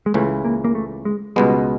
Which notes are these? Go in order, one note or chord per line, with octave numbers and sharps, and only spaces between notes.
G#3
C#2 C#3 E3 A3
A#3
A#3
A3
G#3
C#2 B2 G3 G#3 B3